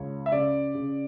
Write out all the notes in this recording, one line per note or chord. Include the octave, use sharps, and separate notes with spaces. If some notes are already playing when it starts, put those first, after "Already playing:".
Already playing: C#2 C#5
E5
C#3 D5
C#3